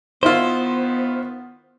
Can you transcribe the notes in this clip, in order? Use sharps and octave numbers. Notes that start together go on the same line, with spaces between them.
D#3 B3 E4 F4 C5